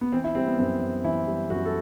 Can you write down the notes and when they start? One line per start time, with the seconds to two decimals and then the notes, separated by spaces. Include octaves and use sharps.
0.01 B3
0.12 E3 C4
0.24 E4
0.35 G3 C4
0.47 B3
0.58 F#2 C4
0.81 F#2
1.04 E3 E4
1.27 G3
1.50 F#2 F#4
1.66 A4